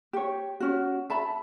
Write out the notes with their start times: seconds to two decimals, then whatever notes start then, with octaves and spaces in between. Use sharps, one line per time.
0.13 G4 C#5
0.60 C#4 F#4
1.10 E5 A5 B5